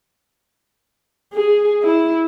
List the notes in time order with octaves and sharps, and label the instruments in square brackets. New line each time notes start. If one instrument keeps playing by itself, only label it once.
[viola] G#4
E4